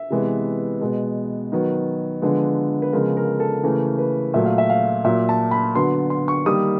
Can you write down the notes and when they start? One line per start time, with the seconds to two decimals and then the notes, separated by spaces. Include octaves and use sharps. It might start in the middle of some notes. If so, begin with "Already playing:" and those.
Already playing: E5
0.10 C3 E3 G#3 B3
0.81 B2 G#3 B3
1.52 D#3 F#3 B3
2.22 D3 F3 G#3 B3
2.82 B4
2.93 C#3 F3 G#3 B3 A#4
3.17 A#4
3.40 A4
3.63 C#3 E3 A3 A#4
3.99 B4
4.33 A#2 F#3 A3 E5
4.46 F5
4.58 E5
4.70 F5
5.04 A#2 F#3 A#3 E5
5.29 A5
5.51 B5
5.75 D3 F#3 B3 C6
6.10 C6
6.28 C#6
6.45 D#3 G3 A#3 D#6